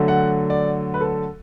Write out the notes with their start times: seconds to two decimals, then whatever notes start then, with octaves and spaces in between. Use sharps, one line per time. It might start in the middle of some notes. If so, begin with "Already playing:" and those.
Already playing: D3 F#3 A3
0.08 F#5
0.50 D5
0.94 B4
1.01 A4